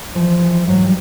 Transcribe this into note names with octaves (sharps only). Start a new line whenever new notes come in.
E3 F3
E3
G#2 F#3
G3